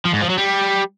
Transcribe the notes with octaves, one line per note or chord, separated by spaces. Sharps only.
F3
G#2
F3
F#3
G3